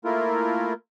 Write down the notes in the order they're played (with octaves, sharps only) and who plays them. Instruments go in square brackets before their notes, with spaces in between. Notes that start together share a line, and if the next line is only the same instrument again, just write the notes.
[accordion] A3 A#3 E4 F4 A#4